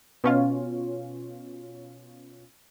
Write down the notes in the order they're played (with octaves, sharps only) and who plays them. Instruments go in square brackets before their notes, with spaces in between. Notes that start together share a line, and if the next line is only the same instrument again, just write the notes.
[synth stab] B2 C#4 F4